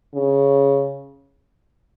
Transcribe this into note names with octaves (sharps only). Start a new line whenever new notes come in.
C#3